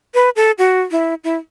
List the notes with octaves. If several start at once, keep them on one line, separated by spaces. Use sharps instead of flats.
B4
A4
F#4
E4
E4